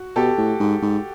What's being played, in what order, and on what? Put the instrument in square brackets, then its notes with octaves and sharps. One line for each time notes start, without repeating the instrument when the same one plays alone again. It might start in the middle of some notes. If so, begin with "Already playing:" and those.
Already playing: [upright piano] F#4
[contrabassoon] B2 [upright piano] G4 A4
[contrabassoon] A2
G#2
G#2